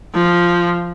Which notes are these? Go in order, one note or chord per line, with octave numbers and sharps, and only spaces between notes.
F3